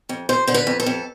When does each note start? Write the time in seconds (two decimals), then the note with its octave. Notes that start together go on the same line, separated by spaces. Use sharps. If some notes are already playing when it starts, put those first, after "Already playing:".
0.09 F2
0.29 F2 C5
0.47 D3 C5
0.54 B4
0.67 F2
0.80 A4
0.86 F2